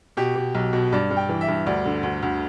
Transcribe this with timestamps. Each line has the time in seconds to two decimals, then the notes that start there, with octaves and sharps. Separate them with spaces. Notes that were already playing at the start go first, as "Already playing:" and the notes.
0.17 B2 G4
0.35 B2
0.55 B1
0.73 B2
0.92 G2 D5
1.11 G2
1.17 G5
1.29 E3
1.41 E5
1.48 G2
1.66 D2 D5
1.85 D3
2.03 D2
2.22 D2